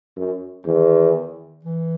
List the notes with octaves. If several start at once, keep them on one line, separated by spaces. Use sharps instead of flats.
F#2
E2 D#3
E3